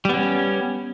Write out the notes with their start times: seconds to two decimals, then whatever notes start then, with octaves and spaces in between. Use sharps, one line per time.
0.05 G3
0.09 B3
0.14 C#4